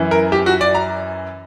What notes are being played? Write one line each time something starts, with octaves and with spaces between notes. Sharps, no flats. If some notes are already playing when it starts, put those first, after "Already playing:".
Already playing: F#2 E3
A#4
G4
F#4
D5
A#5